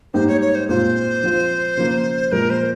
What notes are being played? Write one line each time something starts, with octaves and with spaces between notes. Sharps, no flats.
G#2 G3 A#3 D#4 G4 C5
C#5
C#5
C5
A#2 G#3 C4 F4 C5
F3 C4 F4
C#3 F3 A#3
A#2 F3 G#3 A#4
C5